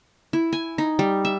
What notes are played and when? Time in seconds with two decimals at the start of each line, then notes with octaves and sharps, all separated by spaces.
0.33 E4
0.53 G#5
0.78 D#4
0.99 G3
1.25 E5